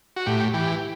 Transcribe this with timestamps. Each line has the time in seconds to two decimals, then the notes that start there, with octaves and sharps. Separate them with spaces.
0.16 F#4
0.26 A2 G4
0.54 E3 G4